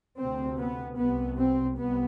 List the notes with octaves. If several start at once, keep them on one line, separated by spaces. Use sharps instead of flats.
D2 C3 C4
B3
C2 C3 B3
C4
C2 B3